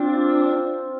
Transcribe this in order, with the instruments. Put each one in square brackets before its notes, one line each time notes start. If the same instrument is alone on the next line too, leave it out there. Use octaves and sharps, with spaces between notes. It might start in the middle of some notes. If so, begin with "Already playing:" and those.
Already playing: [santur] C4 F4 [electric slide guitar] D4